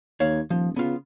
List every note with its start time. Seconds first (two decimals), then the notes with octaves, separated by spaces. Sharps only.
0.20 D#2 C#5 F5
0.50 D#1 F3
0.76 C#3 B3 F4